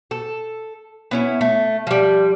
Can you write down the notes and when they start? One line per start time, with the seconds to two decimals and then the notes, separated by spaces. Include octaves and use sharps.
0.11 A4
1.11 B3 C#4 E4
1.41 A3
1.87 F3 G3